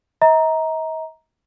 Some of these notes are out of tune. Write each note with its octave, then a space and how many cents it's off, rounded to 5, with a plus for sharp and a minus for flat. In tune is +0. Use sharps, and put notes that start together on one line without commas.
D#5 +45 A#5 +5